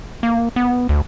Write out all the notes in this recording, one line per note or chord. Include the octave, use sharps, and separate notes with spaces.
A#3
B3
D2